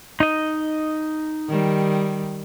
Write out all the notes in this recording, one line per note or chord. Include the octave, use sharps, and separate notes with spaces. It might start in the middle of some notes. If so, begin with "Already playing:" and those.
D#4 D#5
D#3 G3